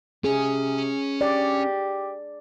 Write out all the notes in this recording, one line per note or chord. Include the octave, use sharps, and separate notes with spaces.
C3 C#4 G#4
G4 D5